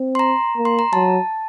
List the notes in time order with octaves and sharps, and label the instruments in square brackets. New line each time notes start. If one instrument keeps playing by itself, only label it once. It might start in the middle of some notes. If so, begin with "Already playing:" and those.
Already playing: [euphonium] C4
[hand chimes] C6
A#5
[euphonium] A#3
[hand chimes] C6
A#5
[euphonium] F#3 [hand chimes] A5